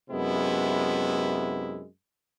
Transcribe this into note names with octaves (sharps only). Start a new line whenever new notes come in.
F#2 C3 G#3 B3 E4